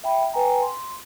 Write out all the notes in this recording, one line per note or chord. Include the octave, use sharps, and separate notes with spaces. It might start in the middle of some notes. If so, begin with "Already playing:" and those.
E5 G5 B5
B4 G5 G#5 A#5
C6